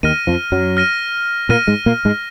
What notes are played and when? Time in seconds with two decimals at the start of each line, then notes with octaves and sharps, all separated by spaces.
0.03 D#2 D#3 F6 A#6 D#7
0.27 F2 F3
0.52 F#2 F#3
0.77 F6 A#6 D#7
1.49 A#2 A#3 F6 A#6 D#7
1.67 G#2 G#3
1.86 A#2 A#3
2.05 G#2 G#3